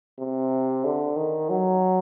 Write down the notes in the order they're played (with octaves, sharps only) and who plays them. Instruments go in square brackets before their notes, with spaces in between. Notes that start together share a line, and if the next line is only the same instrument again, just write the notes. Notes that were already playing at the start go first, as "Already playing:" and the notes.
[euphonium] C3
D3
D#3
F#3